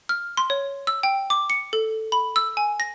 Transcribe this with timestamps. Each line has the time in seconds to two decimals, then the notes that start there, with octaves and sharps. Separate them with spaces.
0.09 F6
0.37 C6
0.50 C#5
0.87 E6
1.03 G5
1.30 D6
1.50 C#7
1.73 A4
2.12 B5
2.36 E6
2.57 G#5
2.80 A#6